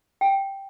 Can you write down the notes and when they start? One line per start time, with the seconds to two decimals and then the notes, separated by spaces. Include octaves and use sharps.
0.21 G5